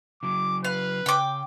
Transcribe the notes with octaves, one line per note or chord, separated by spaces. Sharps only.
C#3 F#3 D6
B4 F5
C#3 G5 D6